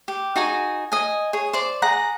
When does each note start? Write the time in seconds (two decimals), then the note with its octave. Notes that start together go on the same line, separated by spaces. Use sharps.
0.08 G4
0.36 D#4 F#4 G#4 G#5
0.92 D#5 G#5
1.33 G#4 C#5
1.53 C5 D5 C6
1.82 G#4 F#5 A#5